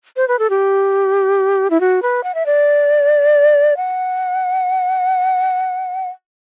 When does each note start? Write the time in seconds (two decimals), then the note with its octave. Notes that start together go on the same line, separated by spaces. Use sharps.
0.16 C5
0.28 B4
0.39 A4
0.50 G4
1.70 E4
1.80 F#4
2.02 B4
2.23 F#5
2.34 E5
2.46 D5
3.77 F#5